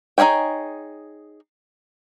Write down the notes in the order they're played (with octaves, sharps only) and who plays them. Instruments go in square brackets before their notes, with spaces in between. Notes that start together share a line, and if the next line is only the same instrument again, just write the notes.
[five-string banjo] D#4 E4 G#4 C#5 G5